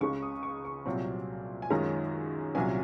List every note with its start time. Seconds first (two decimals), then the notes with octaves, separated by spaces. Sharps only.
0.01 C#2 C#3 G#3 C#6
0.22 D#6
0.43 C#6
0.65 C#6
0.86 C2 A#2 F#3 C4
1.62 G#5
1.70 F#2 D#3 G#3 C#4 F4 A#5
2.55 C2 A#2 F#3 C#4 G#5